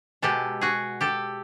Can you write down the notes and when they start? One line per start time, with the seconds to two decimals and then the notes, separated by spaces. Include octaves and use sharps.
0.22 B2 G#3 G4 A4
0.61 F#4 G#4
1.01 G4 A4